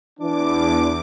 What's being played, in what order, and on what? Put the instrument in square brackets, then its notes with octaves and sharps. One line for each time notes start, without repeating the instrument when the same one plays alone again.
[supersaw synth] E2 D6 [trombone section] E3 D4